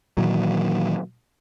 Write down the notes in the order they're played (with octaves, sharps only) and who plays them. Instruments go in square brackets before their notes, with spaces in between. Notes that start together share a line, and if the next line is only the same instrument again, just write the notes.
[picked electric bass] A#2 D#3 E3 F#3